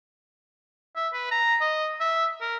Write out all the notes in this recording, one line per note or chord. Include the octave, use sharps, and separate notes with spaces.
E5
B4
A#5
D#5
E5
A#4